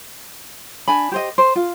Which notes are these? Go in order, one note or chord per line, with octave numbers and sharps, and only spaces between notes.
D4 G#5 B5
G4 C5 D#5
C5
F4